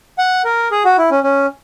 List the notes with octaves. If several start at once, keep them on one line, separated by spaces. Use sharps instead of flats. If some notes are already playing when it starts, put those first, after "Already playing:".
F#5
A#4
G#4
F#4
E4
C#4
C#4